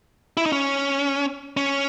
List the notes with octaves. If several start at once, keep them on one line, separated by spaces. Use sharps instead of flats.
E4
D#4
C#4
C#4